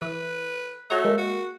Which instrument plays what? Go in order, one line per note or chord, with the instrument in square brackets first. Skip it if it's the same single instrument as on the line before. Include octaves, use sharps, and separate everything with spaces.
[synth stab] E3 [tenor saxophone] B4
[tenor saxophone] A3 [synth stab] F#4 C#5 A#5
[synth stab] G#3 A#3
[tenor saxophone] F#4